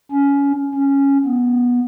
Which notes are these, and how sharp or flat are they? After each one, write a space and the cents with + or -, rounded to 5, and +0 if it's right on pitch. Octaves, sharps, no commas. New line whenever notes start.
C#4 +20
C#4 +0
B3 -15